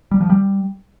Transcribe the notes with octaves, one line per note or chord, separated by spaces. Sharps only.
G3
F3
G3